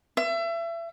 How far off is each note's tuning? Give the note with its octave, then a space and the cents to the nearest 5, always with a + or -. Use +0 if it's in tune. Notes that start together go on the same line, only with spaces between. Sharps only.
E5 +30